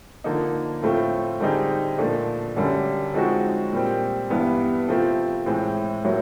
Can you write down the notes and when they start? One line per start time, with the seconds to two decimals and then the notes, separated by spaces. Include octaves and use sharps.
0.24 D3 F3 A#3 D#4
0.82 A2 F3 A3 C4 F4
1.40 D3 G3 C4 D#4 G#4
1.98 A#2 F3 A3 D4
2.56 F#2 D3 G3
3.14 F3 G#3 C4 D#4 F#4
3.72 A#2 G3 C4
4.30 G2 E3 G3 B3
4.88 C3 F3 A3 C4 F4
5.46 A2 E3 G#3 C4
6.04 A2 F#3 A#3